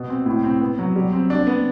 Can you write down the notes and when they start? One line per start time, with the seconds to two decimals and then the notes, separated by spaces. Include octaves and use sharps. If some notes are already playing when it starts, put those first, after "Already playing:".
Already playing: B2
0.10 C4
0.26 A2
0.44 C4
0.61 B3
0.79 F#3
0.96 G3
1.13 C4
1.30 D4
1.47 B3